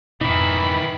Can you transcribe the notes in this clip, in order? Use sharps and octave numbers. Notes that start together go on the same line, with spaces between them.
F2 G#2 B2 D#3 E3 D#4 E5 B5